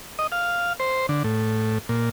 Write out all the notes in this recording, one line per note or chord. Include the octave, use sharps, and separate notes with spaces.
D#5
F5
C5
D3
A2
A#2